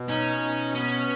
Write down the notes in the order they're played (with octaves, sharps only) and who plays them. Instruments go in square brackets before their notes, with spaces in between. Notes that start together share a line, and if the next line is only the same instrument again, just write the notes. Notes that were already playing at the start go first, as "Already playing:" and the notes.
Already playing: [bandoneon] B2
[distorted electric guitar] C#4 [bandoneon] D#4
[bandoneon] B2
[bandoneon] B3 [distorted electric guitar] C#4